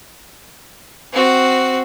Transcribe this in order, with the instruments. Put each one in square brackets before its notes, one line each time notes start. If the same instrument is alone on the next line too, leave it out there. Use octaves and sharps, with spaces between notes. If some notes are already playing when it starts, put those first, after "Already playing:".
[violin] C4 F#4